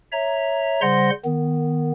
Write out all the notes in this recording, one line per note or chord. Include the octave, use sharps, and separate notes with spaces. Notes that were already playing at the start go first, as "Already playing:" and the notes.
C#5 E5 A#5
C#3 G3 C5 F#5 C6 A#6
D#3 B3